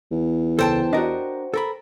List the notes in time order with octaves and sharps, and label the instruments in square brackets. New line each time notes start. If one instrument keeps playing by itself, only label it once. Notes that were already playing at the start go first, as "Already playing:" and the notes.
[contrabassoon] E2
[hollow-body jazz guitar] C#2 A4 [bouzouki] C5 G5 A5
[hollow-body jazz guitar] D4 A#4 [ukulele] F#4 D#5
[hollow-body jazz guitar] A4 A#4 B5